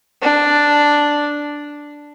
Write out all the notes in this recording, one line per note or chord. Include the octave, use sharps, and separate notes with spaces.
D4